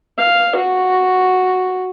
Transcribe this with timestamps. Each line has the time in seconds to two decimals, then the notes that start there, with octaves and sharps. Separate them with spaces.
0.18 F5
0.55 F#4